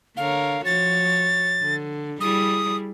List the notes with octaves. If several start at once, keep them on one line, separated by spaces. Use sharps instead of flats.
D3 A#4 C#5 F5
F3 F#4 C#5 A6
D3
G3 E4 G#4 D#6